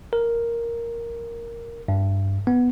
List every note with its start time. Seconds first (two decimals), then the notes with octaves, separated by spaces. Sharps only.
0.13 A#4
1.88 G2
2.47 B3